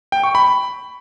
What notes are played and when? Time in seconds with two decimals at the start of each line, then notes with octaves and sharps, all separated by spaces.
0.12 G5
0.24 C#6
0.35 B5